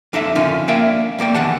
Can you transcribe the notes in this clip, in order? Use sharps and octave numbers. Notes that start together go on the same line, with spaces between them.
F2 D4 D#4 A4 E5
F2 D3 D#3 F3 C#4 F4
A#3 D4 A#4 D5 E5 G5
F2 A#3 D5 G5
E2 D#3 F#5 A5